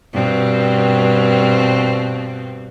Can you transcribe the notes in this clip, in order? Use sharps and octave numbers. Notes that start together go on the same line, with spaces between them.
G2 B2 C4